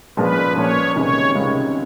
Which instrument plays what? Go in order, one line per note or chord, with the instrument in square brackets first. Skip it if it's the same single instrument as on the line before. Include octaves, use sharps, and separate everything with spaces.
[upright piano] A#1 A#2 F3 G#3 C#4 [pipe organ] B4
[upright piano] A#1 A#2 F3 G#3 C#4 [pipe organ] C#5
[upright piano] C#2 C3 D#3 G#3 C#4 [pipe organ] C#5
[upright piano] C#2 C3 D#3 G#3 C#4